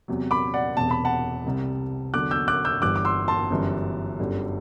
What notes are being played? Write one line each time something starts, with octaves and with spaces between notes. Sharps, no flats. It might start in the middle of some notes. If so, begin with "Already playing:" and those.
E2 C3 F#3
B5 D6
D5 F#5
E1 E2 C3 A5
B5
F#5 A5
C2 C3 G3
E2 D3 F#3 D6 F#6
E6 G6
D6 F#6
E6 G6
G1 G2 E3 G3 D6 F#6
D6
C6 E6
A5 C6
G1 F#2 E3 G3
G1 F#2 D3 G3